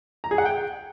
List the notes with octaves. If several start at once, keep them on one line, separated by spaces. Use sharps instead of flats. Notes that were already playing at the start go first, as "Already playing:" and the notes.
A#5
G#4
F#5
G5